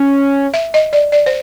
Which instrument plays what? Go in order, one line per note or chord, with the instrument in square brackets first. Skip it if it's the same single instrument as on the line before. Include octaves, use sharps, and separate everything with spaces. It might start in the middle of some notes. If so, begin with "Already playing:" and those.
Already playing: [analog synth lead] C#4
[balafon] E5
D#5
D5
D5
C5